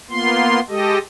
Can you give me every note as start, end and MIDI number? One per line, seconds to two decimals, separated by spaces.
0.10 0.60 58
0.10 0.60 59
0.10 0.60 65
0.10 0.60 84
0.69 0.98 56
0.69 0.98 67
0.69 0.98 69
0.69 0.98 75